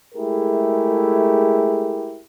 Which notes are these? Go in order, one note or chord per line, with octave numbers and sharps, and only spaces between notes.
G#3 A3 E4 G4 G#4 A#4